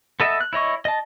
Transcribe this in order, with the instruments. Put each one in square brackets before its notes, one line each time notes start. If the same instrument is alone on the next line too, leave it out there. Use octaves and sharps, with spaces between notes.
[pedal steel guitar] B3 A4 D#5 E5
F#6
E4 C#5 D#5 C#6
D#5 A5